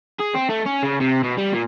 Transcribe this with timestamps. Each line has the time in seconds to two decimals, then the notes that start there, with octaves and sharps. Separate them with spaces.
0.19 G#4
0.34 C4
0.49 A3
0.66 C#4
0.83 C#3
1.01 C3
1.23 B2
1.37 G3
1.53 A#2